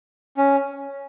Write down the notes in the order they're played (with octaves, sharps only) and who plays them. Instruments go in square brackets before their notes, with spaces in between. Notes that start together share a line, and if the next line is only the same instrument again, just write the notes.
[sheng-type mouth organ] C#4